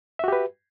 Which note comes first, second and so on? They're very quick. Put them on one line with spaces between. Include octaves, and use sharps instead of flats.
E5 F#4 G4 B4